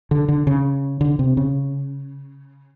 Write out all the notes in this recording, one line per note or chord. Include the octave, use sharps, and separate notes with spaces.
D3
D3
C#3
D3
C3
C#3